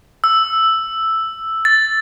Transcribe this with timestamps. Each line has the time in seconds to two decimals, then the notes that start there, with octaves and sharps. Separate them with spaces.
0.24 E6
1.65 A6